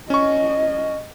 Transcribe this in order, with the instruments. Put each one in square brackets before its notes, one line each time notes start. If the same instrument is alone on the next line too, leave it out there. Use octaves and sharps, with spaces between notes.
[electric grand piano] C#4 C#6 [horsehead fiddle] D#5